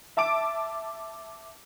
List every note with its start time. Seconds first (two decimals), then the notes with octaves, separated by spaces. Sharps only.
0.17 E5 A5 D6 D7